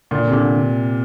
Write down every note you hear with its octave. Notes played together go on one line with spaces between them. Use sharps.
A#2 D3
C3
D3